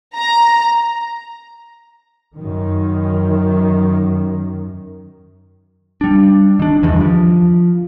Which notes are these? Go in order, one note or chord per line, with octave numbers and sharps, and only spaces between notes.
A#5
F#2 D#3
G3 D4
D#3 D4
E2 G2 D#3 E3
F3